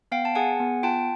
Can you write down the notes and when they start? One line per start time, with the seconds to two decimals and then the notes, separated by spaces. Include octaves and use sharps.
0.12 B3 F5 G5
0.25 A5
0.35 G#4 F#5 G#5
0.60 B3
0.83 F4 G5 A5